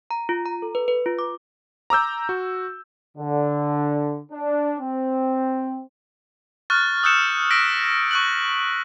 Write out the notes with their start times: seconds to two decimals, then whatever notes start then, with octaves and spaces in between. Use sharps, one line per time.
0.11 A#5
0.29 F4
0.46 A#5
0.62 A4
0.75 B4
0.88 B4
1.06 F4
1.19 D6
1.90 A#5 D6 E6 G6
2.29 F#4
3.18 D3
4.32 D4
4.79 C4
6.70 C#6 F6 F#6 A6
7.03 D#6 E6 F#6 G6 C#7 E7
7.51 E6 A#6 B6 D7
8.11 C#6 F#6 F#7